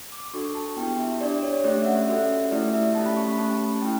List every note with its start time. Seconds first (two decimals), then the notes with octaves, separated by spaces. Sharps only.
0.12 D6
0.33 D4 F#4 A4 C#6
0.55 A5
0.76 B3 E4 G4 G5
0.99 E5
1.20 D4 G4 D5
1.43 C#5
1.64 A3 C#4 G4 D5
1.82 E5
1.86 F#5
2.07 C#4 F#4 A4 E5
2.51 A3 E4 G4 D5
2.73 E5
2.95 A3 C#4 G4 A5
3.06 B5
3.17 C#6
3.27 B5
3.38 A3 C#4 G4 A5
3.74 A5
3.82 A3 C#4 E4 G5